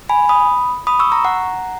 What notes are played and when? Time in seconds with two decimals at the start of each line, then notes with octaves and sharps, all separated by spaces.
0.09 G#5 B5
0.29 B5 D#6
0.87 B5 D#6
0.99 C#6 E6
1.12 A#5 C#6
1.25 F#5 A#5